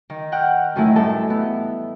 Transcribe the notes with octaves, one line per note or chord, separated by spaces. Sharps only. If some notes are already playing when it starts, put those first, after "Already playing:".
D#3
F#5 G5 F6 F#6
F#2 D#3 E3 A3 E4
A2 G3 A4 A5
B3 E4